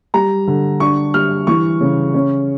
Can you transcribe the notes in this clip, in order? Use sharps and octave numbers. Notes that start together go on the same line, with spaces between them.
G3 A#5
D3
D4 C#6
G3 F6
E3 C#6
C#3
C#4